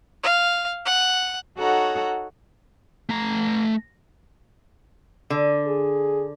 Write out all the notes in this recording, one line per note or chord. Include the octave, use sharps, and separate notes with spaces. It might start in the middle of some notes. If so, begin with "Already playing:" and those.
F5
F#5
D#4 F#4 A4 C#5 F#5 A#5
A3 A#5
D3
G#4